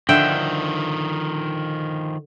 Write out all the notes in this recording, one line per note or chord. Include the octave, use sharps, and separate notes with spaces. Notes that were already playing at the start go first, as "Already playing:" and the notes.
D3 D#3 F3 E5 G5